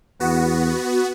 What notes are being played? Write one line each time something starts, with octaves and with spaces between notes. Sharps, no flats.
E2 B3 F#4